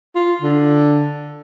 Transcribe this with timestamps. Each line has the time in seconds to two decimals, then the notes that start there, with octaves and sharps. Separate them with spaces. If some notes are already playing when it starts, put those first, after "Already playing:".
0.15 F4
0.42 D3